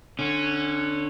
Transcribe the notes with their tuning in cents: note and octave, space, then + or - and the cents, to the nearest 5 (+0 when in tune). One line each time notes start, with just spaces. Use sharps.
D3 +15 C#4 -10